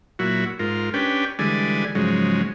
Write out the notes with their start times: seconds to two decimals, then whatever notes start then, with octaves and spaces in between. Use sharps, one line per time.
0.19 A#2 F#3 E4 F#4
0.59 G#2 F4 A#4
0.94 C#4 D4 G4 B4 G5
1.39 D3 E3 G3 G#3 D5 G#5
1.95 G#2 C#3 F3 F#3 G#3